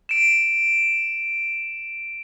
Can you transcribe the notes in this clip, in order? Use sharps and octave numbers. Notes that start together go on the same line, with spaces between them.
D7 E7